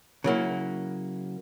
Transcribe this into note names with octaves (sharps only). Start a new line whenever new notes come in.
C#3 F#3 A#3 E4